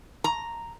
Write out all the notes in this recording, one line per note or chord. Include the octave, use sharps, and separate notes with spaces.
A#5